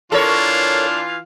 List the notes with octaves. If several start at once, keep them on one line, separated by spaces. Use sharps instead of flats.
E3 D4 F4 A4 A#4 C#5 F5